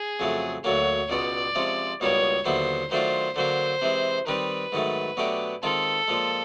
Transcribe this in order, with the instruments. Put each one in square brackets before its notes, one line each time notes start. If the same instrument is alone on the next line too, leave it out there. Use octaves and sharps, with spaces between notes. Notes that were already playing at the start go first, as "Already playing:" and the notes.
Already playing: [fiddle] G#4
[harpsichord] F2 C#3 F#3 A3
[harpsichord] D2 D3 F#3 A#3 [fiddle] C#5
[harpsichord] C#2 B2 G#3 C#4 [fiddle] D5
[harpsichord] C3 F3 G#3 C#4
[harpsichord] C#2 B2 G3 A#3 D#4 [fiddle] C#5
[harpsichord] D#2 D3 F#3 B3 E4 [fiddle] C5
[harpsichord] D#3 F#3 A3 D4 F4 [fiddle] C5
[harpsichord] D3 F#3 A#3 [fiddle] C5
[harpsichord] C3 E3 G#3
[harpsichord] D#3 G3 C4 D#4 [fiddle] B4
[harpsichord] G#2 D#3 F#3 A3
B2 F#3 A3 D4 G4
[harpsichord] D#3 G#3 C4 F4 [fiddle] A4
[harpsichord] A#2 F3 G#3